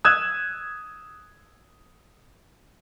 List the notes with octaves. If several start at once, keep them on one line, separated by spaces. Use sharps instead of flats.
D#6 E6 F#6 G#6 E7